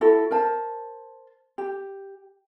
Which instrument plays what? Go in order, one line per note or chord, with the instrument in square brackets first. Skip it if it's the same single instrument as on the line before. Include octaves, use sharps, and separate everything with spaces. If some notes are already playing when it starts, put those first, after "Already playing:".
[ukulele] E4 F#4 A4
A#4 C5 A5
G4